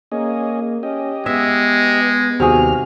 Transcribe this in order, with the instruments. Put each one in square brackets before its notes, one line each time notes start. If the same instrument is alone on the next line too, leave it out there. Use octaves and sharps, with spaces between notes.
[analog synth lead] A#3 [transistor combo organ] C#4 G#4 D#5
[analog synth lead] C#4 [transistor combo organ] G4 D#5
[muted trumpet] G#3 [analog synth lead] B3 [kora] E5
[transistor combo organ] D#2 G3 F6 [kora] C3 F#4 G#4